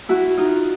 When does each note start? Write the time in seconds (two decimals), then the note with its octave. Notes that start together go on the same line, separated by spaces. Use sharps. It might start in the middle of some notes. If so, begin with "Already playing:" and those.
0.09 E4 F#4
0.37 D#4 F4